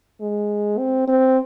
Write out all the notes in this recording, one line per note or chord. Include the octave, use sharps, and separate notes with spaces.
G#3
C4
C4